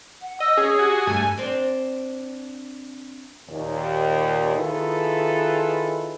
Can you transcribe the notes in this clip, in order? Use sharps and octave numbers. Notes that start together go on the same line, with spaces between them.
F#5
D#5 E6
C#4 G#4
F#4 G4 G#5
G2 A3 G#5
C4 D4
D#2 A#2
D#3 E4 F4 G#4 A4 B4